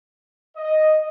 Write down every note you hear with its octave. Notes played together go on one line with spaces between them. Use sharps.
D#5